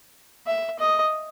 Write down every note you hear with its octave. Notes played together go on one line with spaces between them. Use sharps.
E5
D#5